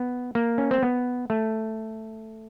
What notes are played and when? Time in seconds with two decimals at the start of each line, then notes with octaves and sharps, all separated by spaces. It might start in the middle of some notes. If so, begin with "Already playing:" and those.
Already playing: B3
0.35 A#3
0.58 C#4
0.71 C4
0.83 B3
1.30 A3